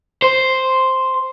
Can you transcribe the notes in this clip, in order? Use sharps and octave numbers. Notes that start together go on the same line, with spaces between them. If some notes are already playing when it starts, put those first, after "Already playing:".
C5